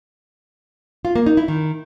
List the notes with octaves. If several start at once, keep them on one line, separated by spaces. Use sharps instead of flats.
F4
A#3
D#4
E4
D#3